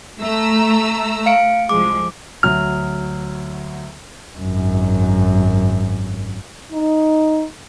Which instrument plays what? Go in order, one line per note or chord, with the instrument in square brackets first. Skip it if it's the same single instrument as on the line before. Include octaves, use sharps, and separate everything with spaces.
[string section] A3 A#5 E6
[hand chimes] F5 C#7 D7
[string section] C2 F3 G#3 [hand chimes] D6
[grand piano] D2 F#3 F6
[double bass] G#1 F#2
[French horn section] D#4